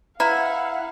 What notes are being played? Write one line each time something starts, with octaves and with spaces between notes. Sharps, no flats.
E4 B4 F5 F#5 A#5